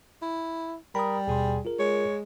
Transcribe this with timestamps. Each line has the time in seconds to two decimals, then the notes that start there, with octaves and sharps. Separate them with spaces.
0.22 E4
0.95 G3 A#4 B5 D#6
1.27 D#2 B2 G#4 C6
1.65 F4 G#4 A#4
1.79 G#3 C#5